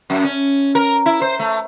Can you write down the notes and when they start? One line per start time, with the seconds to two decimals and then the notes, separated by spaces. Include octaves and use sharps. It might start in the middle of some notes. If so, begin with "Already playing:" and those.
0.10 F#2
0.24 C#4
0.75 A#4
1.06 E4
1.22 C5
1.39 A3